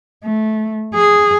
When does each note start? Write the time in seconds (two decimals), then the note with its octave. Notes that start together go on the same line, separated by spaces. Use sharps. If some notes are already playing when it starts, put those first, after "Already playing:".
0.24 A3
0.95 G#4